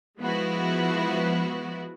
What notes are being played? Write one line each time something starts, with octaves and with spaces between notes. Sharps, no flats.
F3 G#3 B3 E4 F#4